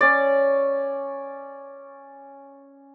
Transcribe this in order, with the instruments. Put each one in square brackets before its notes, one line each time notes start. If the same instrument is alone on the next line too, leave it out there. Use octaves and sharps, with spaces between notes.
[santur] C#4 D5